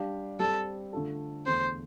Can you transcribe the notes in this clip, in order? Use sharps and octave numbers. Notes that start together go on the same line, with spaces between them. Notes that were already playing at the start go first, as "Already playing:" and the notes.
Already playing: G3 D4 G4 D5 F5
G3 C4 G4 A4 C5
D3 A3 D4 F4 A4
E2 D3 A3 C5